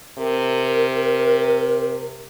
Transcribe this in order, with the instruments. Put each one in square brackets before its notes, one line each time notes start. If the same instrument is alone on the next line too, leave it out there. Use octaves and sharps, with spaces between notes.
[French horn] C3 [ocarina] A#4